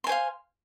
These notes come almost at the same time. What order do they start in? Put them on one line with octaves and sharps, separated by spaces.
C6 G#5 C5 F5